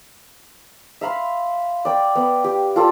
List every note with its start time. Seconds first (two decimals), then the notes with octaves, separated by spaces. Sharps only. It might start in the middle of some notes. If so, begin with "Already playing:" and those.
1.01 E5 F5 B5 C6
1.85 D5 G5
2.15 B3
2.44 G4
2.76 F4 A4 D5